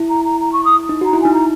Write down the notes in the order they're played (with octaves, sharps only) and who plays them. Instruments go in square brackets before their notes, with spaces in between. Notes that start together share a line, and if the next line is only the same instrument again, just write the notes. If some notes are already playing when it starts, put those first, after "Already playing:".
Already playing: [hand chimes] E4
[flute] A#5
A#5
A#5
C#6
D#6
[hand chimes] D#4
[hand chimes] F#4 [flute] A#5
[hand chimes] E4
[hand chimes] D#4 [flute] G#5
[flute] A#5